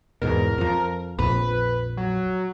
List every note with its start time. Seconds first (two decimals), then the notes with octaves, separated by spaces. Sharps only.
0.22 E2 G#2 B2 A#4
0.58 F2 F3
1.19 A#1 F2 B4
1.97 F#3